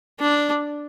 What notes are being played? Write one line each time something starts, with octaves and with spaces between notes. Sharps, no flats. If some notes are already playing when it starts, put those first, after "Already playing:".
D4